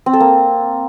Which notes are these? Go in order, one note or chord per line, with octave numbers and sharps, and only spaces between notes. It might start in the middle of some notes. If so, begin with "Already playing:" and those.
C4
A4
A#3